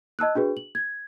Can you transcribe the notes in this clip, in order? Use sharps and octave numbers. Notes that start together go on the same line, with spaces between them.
D#5 A5 E6 F#6
D4 F#4 G#4 B4
F#7
G#6